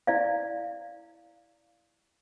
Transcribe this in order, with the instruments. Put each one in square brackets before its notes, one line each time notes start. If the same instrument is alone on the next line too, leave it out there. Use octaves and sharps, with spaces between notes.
[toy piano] E4 D5 F5